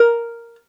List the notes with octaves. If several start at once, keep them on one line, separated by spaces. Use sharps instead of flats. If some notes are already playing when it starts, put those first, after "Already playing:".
Already playing: A#4